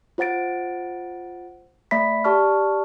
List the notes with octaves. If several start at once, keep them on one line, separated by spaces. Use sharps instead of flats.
F4 C5 F#5 A6 D7
A3 D5 E5 B5 B6
G4 D5 A5 C#6 F6